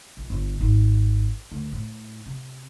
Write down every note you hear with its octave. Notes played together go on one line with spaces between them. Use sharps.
A#1
G1
G#1
D2
A2
C3